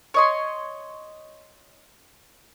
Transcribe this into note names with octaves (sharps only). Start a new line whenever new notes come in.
C#5 D#5 C6